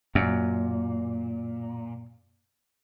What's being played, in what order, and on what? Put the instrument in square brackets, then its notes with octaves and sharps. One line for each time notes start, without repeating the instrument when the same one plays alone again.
[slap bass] F#2 [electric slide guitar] A#2